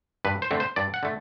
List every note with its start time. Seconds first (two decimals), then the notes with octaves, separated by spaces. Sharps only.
0.25 G2 B4
0.42 C5
0.51 D3 A3 C4
0.60 C5
0.76 G2 D5
0.94 F#5
1.03 D3 A3